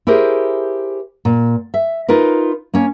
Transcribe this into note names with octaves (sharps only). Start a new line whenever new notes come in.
E4 G4 G#4 A#4 C5
A#2
E5
D#4 F4 A#4 B4
A#3 C#4